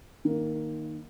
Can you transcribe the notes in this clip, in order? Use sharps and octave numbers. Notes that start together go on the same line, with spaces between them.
D#3 A#3